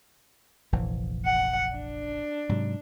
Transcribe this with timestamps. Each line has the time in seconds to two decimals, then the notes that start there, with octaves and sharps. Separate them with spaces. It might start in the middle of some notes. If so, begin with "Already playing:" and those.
0.72 F1 A#1 E3
1.26 F#5
1.75 D4
2.49 G#2 C3 F#3